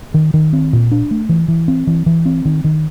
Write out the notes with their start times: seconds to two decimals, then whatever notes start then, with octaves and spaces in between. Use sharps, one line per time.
0.14 D#3
0.34 D#3
0.53 C4
0.73 A#2
0.92 D4
1.11 A3
1.29 E3
1.48 E3
1.68 C4
1.87 E3
2.06 E3
2.26 C4
2.45 D#3
2.64 D#3